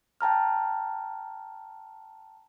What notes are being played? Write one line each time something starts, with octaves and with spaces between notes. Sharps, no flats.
G5 A5 A#5 F6